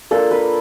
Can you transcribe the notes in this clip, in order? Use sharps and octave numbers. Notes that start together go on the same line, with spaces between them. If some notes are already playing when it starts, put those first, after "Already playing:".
A#3 D4 F4 A4
B4